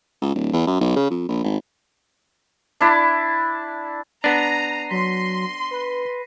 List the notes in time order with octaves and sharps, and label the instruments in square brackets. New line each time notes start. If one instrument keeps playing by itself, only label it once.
[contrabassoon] C#2
D1
E2
F#2
B1
C#3
F2
A#1
G#1
[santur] D4 E4 D5
[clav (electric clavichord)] B3 D4 [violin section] A#5 [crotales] A#6 C7 D#7
[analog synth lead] F#3 [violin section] C6 [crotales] B6
[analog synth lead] B4